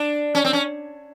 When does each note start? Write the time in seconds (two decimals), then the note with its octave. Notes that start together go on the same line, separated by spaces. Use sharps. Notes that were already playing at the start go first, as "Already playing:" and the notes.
Already playing: D4
0.35 C#4
0.45 C4
0.53 C#4